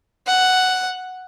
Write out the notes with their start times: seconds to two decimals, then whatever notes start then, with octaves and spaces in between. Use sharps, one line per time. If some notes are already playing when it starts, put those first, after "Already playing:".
0.27 F#5